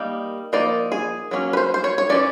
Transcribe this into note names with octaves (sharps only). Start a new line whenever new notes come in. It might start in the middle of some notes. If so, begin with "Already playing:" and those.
Already playing: G3 A#3 D#4
F3 A#3 D#4 D5
G#4
F#3 A#3 C#4
B4
C5
C5
C#5
C#5
E3 A3 C#4 D5